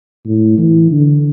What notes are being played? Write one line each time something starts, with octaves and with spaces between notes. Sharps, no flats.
A2
E3
D3